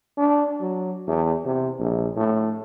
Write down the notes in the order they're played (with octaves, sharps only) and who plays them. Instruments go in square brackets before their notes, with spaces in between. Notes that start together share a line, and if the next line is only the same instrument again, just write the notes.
[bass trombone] D4
F#3
E2
C3
A#1
A2